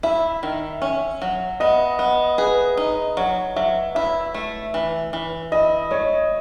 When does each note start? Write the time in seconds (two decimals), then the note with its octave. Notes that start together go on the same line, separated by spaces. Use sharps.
0.03 E4 E5
0.43 D#3
0.82 C#4
1.22 F#3
1.60 B3 D#5
1.99 B3
2.38 G#4 B4
2.77 D#4
3.17 F#3 C#5
3.56 F#3 E5
3.95 E4 E5
4.34 A3
4.74 E3
5.13 E3
5.52 E4 D#5
5.91 A3 C#5